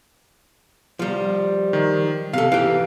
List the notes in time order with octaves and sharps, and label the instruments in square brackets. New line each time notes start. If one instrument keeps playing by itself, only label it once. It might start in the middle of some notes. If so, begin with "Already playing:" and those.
[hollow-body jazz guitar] F3 G3
[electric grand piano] D#3
[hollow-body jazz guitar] C3 A4 [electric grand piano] F5
[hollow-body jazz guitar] E3 G4 [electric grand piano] F5